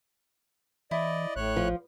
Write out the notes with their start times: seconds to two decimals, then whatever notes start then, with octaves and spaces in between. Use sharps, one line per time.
0.91 E3 E4 D5 D#5
1.36 A1 A2 C#5 F#6
1.56 F3